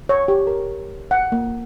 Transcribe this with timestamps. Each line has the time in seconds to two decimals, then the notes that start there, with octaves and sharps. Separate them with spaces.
0.09 C#5
0.28 G4
0.47 A#4
1.11 F#5
1.32 A#3